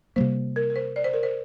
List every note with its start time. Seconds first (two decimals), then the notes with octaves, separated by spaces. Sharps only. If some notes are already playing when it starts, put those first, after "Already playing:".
0.16 C3 G3 A#3 C5
0.56 A#4
0.70 A#4
0.76 C5
0.96 D5
1.04 C5
1.13 A#4
1.23 C5